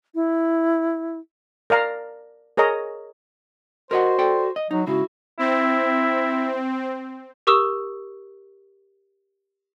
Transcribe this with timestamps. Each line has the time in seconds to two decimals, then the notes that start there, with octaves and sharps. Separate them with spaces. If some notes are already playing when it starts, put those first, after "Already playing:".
0.15 E4
1.70 A#4 D5 F5 A#5
2.57 G#4 A#4 C#5 D#5 A#5
3.91 F#4 A#4 C5 D#5 F#5
4.18 A4 D5 G5
4.56 D#5
4.71 F#3 D#4
4.87 G#2 C#3 E4 F#4
5.39 C4 E4
7.47 G4 A#4 C#6 D#6 E6 E7